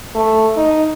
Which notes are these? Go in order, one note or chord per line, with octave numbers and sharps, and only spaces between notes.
A3
D#4